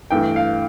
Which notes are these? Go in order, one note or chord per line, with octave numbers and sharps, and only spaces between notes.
G2 E3 A3 G5
F5